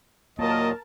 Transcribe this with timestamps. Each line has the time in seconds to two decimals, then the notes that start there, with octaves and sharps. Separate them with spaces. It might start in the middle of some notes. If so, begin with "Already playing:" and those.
0.39 D#2 A#2 F#3 A#3 A#4 D#5 A5